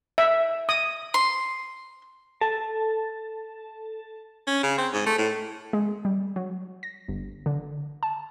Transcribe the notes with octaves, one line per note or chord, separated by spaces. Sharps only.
E5
D#6
C6
A4 A5
C#4
C#3
C4
G#2
A3
A2
G#3
G3
F#3
A#6
G1
D3
A5